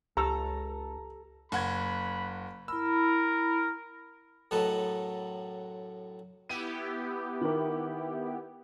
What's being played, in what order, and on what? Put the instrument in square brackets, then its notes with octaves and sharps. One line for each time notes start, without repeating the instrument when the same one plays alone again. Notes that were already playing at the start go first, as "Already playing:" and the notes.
[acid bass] C#2 [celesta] G4 [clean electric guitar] A4 [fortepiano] A#5
[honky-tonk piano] F#1 F#5 G#6 [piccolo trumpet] B5
[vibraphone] E4 B5 [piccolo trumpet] A#4 [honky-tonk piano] E6
[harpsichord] F#2 A2 F#3 A4 B4 D#5
[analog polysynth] B3 E4 G4 [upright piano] D#7
[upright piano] D#3 A#4